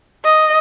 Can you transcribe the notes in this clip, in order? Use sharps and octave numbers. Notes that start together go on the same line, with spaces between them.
D#5